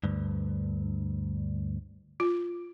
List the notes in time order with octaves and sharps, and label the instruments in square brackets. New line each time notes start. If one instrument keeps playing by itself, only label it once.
[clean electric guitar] D2 G2
[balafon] F4